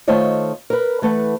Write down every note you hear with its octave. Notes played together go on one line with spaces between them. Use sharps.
D#3 A3 F4 C5 C#5 D#5
A#4 B4
E3 A3 B4 F#5